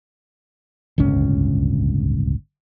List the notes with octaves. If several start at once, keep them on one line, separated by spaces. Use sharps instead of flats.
D1 G1 C#2 C#4